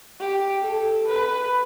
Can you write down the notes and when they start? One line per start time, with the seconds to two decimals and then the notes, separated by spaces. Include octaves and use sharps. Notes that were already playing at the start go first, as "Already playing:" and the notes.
0.20 G4
0.63 A4
1.07 B4